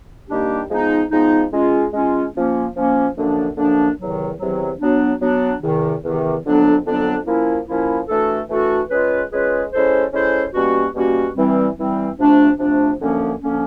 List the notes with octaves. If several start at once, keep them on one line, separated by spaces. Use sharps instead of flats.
D#3 G3 A#3 D4 G4
F3 G#3 B3 D#4
F3 G#3 B3 D#4
G#3 C#4 F4
G#3 C#4 F4
F3 A#3 C#4
F3 A#3 C#4
F#2 D3 F3 A#3 D4
F#2 D3 F3 A#3 D4
E2 C3 D#3 F#3
E2 C3 D#3 F#3
F#3 B3 D4
F#3 B3 D4
E2 C3 D#3
E2 C3 D#3
F2 D3 F#3 B3 D4
F2 D3 F#3 B3 D4
F3 A#3 C#4 E4
F3 A#3 C#4 E4
E3 A3 D4 F#4 A4
E3 A3 D4 F#4 A4
G#3 C#4 F4 G#4 B4
G#3 C#4 F4 G#4 B4
G#3 C#4 E4 A4 C5
G#3 C#4 E4 A4 C5
B2 G3 A#3 C#4 F#4
B2 G3 A#3 C#4 F#4
E3 G3 C4
E3 G3 C4
C3 F3 A3 D4
C3 F3 A3 D4
F#2 D3 F3 A#3 C#4
D3 F3 A#3 C#4